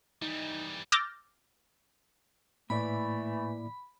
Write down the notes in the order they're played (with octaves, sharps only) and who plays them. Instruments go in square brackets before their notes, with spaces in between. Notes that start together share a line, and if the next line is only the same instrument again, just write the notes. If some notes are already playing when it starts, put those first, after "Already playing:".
[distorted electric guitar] E3 G3 [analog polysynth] D#4
[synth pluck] D6 E6 F6 G6 A6 A#6
[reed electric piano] A2 [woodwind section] E3 A3 [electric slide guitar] A#3 E4 D5 [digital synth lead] B5